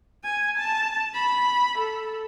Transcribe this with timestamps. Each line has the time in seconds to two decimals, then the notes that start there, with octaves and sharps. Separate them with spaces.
0.24 G#5
0.57 A5
1.14 B5
1.78 A4